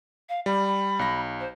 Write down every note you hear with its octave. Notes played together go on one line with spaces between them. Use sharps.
F5
G3 B5
B1 A#6
C5